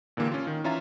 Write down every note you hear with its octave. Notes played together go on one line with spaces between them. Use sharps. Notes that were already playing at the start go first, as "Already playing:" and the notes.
A#2 D3 E3 A#3 G4
C#4 F4
D#3
E3 C#4 F4 E5 A#5 A6